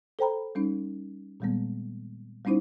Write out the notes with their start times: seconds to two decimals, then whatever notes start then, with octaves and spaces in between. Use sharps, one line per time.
0.19 A4 C5 G5 A#5 B5
0.55 G3 C#4 D#4
1.40 A#2 D#3 G3 G#3 A#3 B3
2.45 G3 B3 C#4 D#4 E4 C5